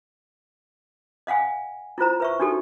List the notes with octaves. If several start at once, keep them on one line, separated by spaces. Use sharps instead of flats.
D#5 F5 F#5 G#5
E4 F4 C5 A#5
B4 E5 C#6
D4 D#4 F#4 G4 A4